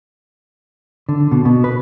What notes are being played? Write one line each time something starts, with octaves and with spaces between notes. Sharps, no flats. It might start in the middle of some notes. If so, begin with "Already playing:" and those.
D3
B2
B2
B4